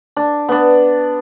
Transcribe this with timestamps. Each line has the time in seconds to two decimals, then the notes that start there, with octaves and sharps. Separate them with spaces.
0.17 D4
0.49 B3 D4